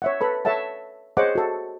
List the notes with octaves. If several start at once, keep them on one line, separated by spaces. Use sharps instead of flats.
C#5 E5 F#5
A4 B4 B5
A4 C#5 E5 F#5 A5
G#4 C5 C#5 D#5 F#5 D6
F#4 A4